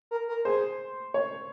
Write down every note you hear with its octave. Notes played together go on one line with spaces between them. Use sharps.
A#4
A#4
G#4 C5
C#5